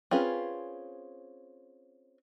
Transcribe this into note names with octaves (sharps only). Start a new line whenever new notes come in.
C4 C#4 F4 G#4 B4